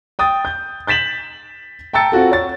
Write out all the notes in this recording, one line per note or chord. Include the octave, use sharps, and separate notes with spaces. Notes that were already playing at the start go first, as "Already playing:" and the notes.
G5 D#6 A6
G6
G6 A6 B6 E7 F#7
G5 A5 A#5 E6 A6 C#7
C4 F4 F#4 A4
C#5 A6